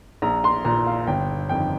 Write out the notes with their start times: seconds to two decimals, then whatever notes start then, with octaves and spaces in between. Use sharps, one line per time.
0.22 A#1 A#5
0.44 C6
0.65 A#2 A#5
0.87 F5
1.07 G1 G5
1.49 F2 D#3 G5